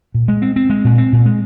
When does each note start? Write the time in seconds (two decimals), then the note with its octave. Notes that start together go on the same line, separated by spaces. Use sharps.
0.14 A#2
0.28 G#3
0.42 C4
0.56 C4
0.70 G#3
0.85 A#2
0.98 C4
1.13 A#2
1.26 G#3